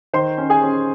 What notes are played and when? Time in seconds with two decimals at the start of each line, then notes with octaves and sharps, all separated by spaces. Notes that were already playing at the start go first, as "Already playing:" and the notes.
0.13 D#3 C5 C6
0.38 C#4
0.50 G#4 G#5
0.63 C#4